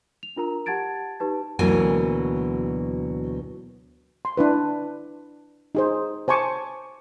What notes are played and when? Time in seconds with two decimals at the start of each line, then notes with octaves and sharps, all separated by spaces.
0.23 F7
0.37 D4 F4 A#4 A#5
0.66 G4 F#5 A5 G#6 A6 D7
1.20 D#4 G4 B4 A5
1.59 D2 B2 E3 F#3 A#3 G#5
4.25 C6
4.37 D4 E4 B4
5.75 D#4 G#4 C5
6.28 C5 G#5 A5 C#6 D6